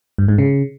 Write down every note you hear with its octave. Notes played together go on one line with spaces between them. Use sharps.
G2
G#2
C#3